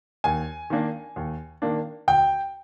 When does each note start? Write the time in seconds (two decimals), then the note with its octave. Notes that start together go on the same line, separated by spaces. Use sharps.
0.24 D#2 G#5
0.70 D#3 A#3 D4
1.16 D#2
1.62 D#3 A#3 D4
2.08 D2 G5